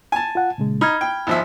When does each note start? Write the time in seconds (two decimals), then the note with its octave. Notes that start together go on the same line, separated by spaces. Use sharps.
0.12 G#5 A5
0.35 F4 F#5
0.58 A#2 C#3 G#3
0.81 D#4 B5 F6 G#6
1.01 G5
1.27 G#1 F3 E5